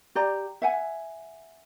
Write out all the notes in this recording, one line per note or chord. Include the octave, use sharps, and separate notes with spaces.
G4 D5 A#5
E5 F#5 G#5